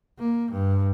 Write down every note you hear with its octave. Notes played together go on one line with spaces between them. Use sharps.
A#3
G2